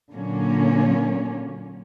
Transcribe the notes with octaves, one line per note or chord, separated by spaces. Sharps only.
A#2 D3 F#3 A#3 C#4